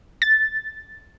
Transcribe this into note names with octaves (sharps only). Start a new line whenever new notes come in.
A6